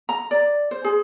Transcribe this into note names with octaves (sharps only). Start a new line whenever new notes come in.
A#5
D5
C5
G#4